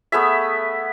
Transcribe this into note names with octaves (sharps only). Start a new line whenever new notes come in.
A3 B3 G#4 E5